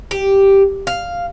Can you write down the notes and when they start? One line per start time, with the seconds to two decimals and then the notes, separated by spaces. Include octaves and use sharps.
0.11 G4
0.87 F5